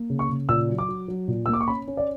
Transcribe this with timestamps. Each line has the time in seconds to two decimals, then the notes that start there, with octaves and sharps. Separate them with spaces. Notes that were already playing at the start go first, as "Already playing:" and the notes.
Already playing: A#3
0.10 C#3
0.19 C#6
0.29 C#3
0.49 A#2 E6
0.69 F#3
0.78 D6
0.89 F#3
1.08 F#3
1.28 A#2
1.46 E6
1.48 A#3
1.53 D6
1.61 C#6
1.68 C#4 B5
1.87 C#4
1.97 D5